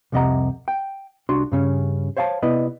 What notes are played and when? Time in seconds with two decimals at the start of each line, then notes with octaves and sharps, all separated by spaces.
0.12 C2 F2 C3 D#5 F#5 A#5
0.68 G5
1.29 C2 D4 F#4 C6
1.52 G2 C#3 C#4
2.17 C5 C#5 F5 F#5 A5
2.43 C3 B3 E4 B4 D5 D#5